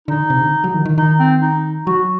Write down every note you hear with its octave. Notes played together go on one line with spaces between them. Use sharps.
D3 D#4
C3
D3
F#3
D#3
D#3
D#3 D#4
C4
D#4
F#3 F#4